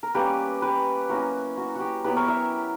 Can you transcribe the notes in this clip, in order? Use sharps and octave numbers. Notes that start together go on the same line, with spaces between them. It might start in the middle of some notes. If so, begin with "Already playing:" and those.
A#4
G3 A#3 C#4 G4 B4
G4 B4
F#3 A#3 C#4 E4 F#4 A#4
F#4
F#4 G4
F#3 B3 E4 G4 B4
A#4 C#5
C#5 E5